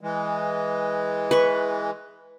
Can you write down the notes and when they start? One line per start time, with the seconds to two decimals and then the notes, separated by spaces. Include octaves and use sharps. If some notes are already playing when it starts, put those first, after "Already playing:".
0.01 E3 G#3
1.31 B4 C#6